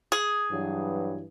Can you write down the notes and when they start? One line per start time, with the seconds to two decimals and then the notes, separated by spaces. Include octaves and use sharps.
0.12 G#4
0.51 G2 E3 F#3